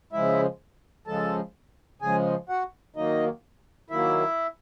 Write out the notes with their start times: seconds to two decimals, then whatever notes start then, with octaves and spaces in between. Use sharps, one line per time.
0.13 C#3 F3 G#3 E4 E5
1.07 C#3 F3 G#3 A4 A5
2.02 C#3 F3 G#3 G#4 G#5
2.49 F#4 F#5
2.96 D#3 F#3 A#3 D#4 D#5
3.90 D#3 F#3 A#3 E4 E5